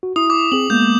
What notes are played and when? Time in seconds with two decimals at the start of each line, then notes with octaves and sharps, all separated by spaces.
0.03 F#4
0.16 E4 D#6
0.30 D6
0.52 C4 G#4 F#7
0.70 G#3 A#3 B3 G6